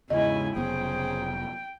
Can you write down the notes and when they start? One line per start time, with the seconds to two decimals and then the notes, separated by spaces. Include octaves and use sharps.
0.10 E2 G#2 C#3 E4 D#5 G#5
0.56 F1 C#3 F#3 B3 G#4 C5 G5